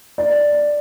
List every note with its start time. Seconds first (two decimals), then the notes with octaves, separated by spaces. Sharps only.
0.18 D5